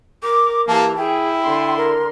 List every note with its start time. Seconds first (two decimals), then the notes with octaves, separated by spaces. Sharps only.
0.23 A#4 D6
0.68 E3 A#3 G4 A5
0.97 E4 G#4 G5
1.44 D3 C6
1.77 A#4